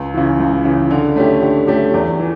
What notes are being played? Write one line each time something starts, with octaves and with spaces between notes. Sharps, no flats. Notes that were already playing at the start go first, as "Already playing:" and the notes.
Already playing: C#2
C#3 E3
C#2
C#3 E3
D3
A3 C#4 G4
D3
A3 C#4 G4
E2
E3